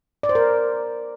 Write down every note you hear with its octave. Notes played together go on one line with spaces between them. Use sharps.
D5
C5
A#4